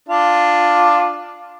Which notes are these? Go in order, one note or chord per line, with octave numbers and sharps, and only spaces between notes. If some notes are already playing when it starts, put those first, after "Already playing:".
D4 F4